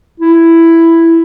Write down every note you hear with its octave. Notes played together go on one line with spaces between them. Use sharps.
E4